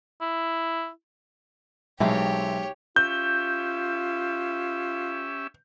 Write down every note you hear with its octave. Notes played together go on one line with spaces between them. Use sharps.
E4
B1 E3 G#3 A3 C4 G4 C#5
C#4 F4 G4 E5 G6